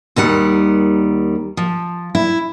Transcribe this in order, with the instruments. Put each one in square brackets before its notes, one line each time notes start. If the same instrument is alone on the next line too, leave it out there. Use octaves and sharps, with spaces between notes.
[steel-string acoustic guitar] D#2 D#3 G3 F#5
F3
E4